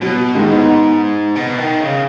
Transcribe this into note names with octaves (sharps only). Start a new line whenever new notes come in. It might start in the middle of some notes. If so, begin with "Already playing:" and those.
B2 F#3
G#2 D#3 G#3
B3 D#4
B2
D#3
C#3